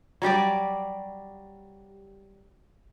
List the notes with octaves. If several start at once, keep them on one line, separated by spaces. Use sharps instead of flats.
F#3 G3 G4 D5